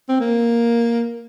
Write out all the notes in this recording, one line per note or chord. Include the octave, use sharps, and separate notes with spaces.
C4
A#3